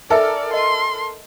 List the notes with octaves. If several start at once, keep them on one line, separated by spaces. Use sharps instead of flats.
D#4 A4 A#4 D5 E5 G#5
D#5 A5 C6